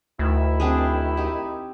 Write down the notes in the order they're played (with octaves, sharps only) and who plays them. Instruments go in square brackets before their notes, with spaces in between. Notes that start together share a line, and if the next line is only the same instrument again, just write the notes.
[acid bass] D2 [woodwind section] D#3 E4
[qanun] C4 D4 G#4
D#4 G4